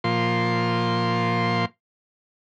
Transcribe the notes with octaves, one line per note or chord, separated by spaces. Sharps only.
A#2 F3 C6